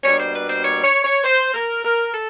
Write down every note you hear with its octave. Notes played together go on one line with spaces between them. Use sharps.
B2 G3 A#3 D4 C#5
C5
B4
C5
C#5
C#5
C#5
C5
A#4
A#4
A4